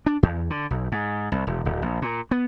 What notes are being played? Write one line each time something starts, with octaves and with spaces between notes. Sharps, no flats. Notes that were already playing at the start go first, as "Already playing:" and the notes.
D4
E2
D3
B1
G#2
C2
E1
D1
A#1
A#2
B3